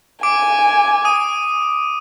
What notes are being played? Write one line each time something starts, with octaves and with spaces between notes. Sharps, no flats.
G#5 D6 D7
D#6 D#7